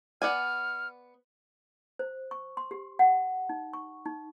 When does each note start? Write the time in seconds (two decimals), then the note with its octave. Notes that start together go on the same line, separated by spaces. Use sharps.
0.22 B3 D5 G#5 F6
1.99 C5
2.31 C#6
2.57 C6
2.71 G4
2.99 F#5
3.49 D#4
3.73 C#6
4.06 D#4